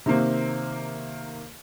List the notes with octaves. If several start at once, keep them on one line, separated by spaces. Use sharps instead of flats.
C3 D#3 A#3 C4